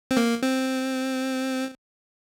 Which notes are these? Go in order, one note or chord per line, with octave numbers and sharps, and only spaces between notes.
C4
A#3
C4